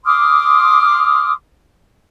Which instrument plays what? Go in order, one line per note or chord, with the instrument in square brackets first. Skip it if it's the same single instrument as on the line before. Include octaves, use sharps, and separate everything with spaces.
[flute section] C6 D6 D#6 F6